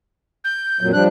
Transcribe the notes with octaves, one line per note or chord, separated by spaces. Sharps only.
G6
F2 A#2 F#3
F3 G3 D4 F#6